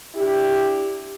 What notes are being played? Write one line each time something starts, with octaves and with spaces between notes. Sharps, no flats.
D4 E4 G4